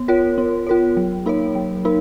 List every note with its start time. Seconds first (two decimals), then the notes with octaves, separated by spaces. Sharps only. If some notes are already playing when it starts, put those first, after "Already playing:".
Already playing: B3
0.08 F4 A#4 C#5
0.38 B3
0.67 F4 A#4 C#5
0.97 F#3
1.26 A#3 D#4 A#4 C#5
1.55 F#3
1.85 A#3 D#4 A#4